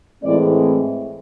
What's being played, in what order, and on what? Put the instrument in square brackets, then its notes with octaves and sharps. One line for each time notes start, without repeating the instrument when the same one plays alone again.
[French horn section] A2 E3 G#3 C4 D5